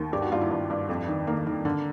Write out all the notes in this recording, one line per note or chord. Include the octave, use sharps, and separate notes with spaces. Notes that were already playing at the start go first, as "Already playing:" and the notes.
Already playing: D#2
G2 G4
F#4
G2 F4
E4
G2
G2
F2
D#3
D#3 A#3
D#3
D3